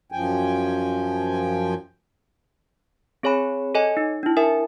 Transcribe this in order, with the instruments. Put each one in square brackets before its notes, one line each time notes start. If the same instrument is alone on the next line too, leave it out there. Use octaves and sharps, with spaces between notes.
[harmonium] F#2 F3 G5 G#5
[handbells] C4 G#4 C#5 G#5 B5
A4 C#5 D#5 G#5
D#4
D4 E4
A#4 E5 G#5